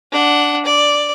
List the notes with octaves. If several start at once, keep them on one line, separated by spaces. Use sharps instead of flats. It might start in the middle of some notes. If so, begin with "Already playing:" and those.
D4 F#5
D5